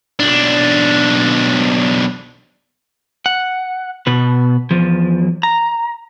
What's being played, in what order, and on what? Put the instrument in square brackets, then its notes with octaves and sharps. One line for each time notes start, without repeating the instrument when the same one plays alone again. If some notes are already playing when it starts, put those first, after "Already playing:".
[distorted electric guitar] B1 D4
[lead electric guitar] F#5
B2 B4
E2 F3
A#5